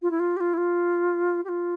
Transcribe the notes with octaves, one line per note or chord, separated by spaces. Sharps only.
F4
E4
F4
G4
F4
E4
F4
G4
F4